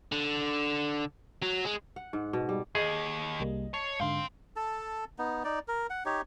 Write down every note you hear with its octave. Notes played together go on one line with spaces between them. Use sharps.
D3
F#3
G#3
F#5
G#2
B2
G3
D#2 G#4 D#5
C2 G3 A#3
C#5 A5 C7
G#2 D3 F5 G5 C6
A4 A5
B3 D#4
D#4 D5
A#4
F#5
D#4 G4 C#5